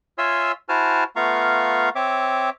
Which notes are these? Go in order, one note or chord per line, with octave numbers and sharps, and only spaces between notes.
F4 C#5 E5 G#5 C6 E6
E4 F#4 C5 G#5 A5 F6
A3 B3 F4 F5 A#5 C#6
C4 C#5 E5 D6